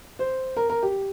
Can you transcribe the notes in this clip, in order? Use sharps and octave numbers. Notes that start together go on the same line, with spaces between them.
C5
A#4
A#4
G4